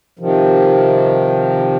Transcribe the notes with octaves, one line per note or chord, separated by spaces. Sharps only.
C3 D#3 F3